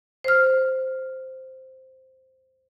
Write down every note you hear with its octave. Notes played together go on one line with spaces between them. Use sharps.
C5 F6